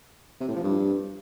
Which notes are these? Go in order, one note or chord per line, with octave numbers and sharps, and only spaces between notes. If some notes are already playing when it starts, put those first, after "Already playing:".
C3
A2
F3
G2